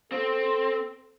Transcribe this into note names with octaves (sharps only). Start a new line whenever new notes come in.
C4 A4